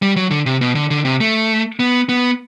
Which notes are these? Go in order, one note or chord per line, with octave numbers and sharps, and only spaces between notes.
G3
F#3
D3
C3
B2
D3
D3
C3
A3
B3
B3